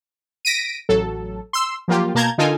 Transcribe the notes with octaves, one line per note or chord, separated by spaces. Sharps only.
A#6 B6 D7 D#7
A1 F#3 A4
C6 E6
F3 F#3 A#3 F4 G4
B2 A#3 A5 A#5 G6 G#6
D3 D#4 F4 A4 A#4 G#5